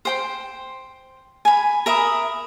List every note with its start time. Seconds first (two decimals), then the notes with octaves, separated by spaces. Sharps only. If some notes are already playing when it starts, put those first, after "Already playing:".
0.05 C5 G5 C6
1.45 G#5 B5
1.86 A#4 E5 B5 D#6